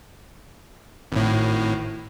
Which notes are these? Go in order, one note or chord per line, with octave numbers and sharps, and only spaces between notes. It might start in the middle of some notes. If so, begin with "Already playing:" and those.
G#1 A2